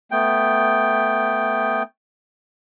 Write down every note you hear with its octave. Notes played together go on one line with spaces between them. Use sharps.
A3 B3 G5